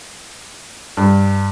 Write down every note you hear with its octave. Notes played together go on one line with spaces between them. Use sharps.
G2